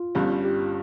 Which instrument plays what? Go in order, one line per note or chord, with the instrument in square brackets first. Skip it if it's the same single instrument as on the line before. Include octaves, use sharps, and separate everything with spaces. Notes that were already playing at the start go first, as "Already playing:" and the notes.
Already playing: [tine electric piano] F4
[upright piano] G1 G2 G3 C#4
[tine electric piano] G4